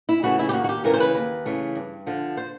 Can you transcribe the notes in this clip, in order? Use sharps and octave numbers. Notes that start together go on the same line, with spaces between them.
E4
C#3 E3 A3 F#4
E4
G4
D#2 F#4
F#4
G4
C#3 E3 A3 A#4
C5
B4
D#2
C#3 E3 A3
G2
D3 F3
C5